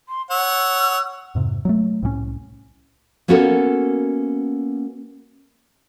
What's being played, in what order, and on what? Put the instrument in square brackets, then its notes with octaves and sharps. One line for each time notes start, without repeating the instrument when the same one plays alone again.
[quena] C6
[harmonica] C#5 F#5 [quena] E6
[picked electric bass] F2 G#2 C3
F#3 G#3 A3
C2 A2 E3 C#4
[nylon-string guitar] A#3 B3 C#4 F#4 A4 A#4